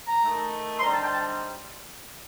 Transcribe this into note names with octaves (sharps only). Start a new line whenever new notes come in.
A#5
D#3 A3 D#4
C6
D3 G3 C4 D#4 A#5
A5
G5
A5